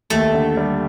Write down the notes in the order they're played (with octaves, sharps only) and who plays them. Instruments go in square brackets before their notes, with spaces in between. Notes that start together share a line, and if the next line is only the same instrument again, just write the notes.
[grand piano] D#2 [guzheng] A3
[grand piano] D3
G3